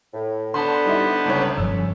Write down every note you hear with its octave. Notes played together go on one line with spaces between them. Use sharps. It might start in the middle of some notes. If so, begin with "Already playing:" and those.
A2
D3 B3 B4 C5 A5 C6
G3 D#4 E4
G1 C#2 C#5
F#1 G2 F3 C#4 E6